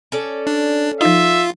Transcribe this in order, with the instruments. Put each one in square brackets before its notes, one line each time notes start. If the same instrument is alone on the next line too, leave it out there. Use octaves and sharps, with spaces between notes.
[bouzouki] C#4 A4 D5
[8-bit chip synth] D4
[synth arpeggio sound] F3 D#4 [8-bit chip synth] F4 [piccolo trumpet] E5